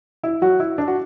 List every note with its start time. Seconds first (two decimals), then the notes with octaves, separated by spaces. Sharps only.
0.23 E4
0.42 F#3 F#4
0.60 E4
0.78 D4
0.88 F#4